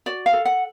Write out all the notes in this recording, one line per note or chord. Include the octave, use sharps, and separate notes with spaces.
F#4 D5
F5
A4
F#5